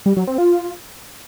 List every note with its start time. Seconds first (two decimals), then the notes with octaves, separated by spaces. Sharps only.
0.06 G3
0.17 F#3
0.27 C4
0.38 F4